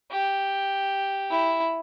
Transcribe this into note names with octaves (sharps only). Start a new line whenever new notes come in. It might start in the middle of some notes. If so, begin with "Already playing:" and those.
G4
E4